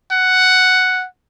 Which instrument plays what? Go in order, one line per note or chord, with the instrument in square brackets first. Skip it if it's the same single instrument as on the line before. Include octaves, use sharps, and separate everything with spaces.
[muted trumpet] F#5